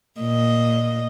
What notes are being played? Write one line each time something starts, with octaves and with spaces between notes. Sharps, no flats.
A#2 D#5